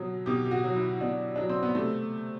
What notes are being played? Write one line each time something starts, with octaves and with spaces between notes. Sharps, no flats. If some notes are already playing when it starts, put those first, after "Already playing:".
Already playing: B2 F#3
B2 G4
G4
F#4
F#3
E4
B2 D4
F#3 D4
C4
B3
C3 A3